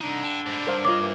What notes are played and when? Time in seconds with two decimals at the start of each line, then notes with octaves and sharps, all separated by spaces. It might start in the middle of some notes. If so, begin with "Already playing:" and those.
0.01 C2 D3 D4 D#4
0.24 G5 A5
0.46 G#2 G3
0.67 G2 A#4 C5 F5
0.85 F4 A#4 C#5 D#5 F5 D6
0.99 C3 E3 A#3